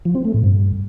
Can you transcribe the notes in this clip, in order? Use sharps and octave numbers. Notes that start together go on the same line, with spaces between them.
F3
C4
A3
A2
G2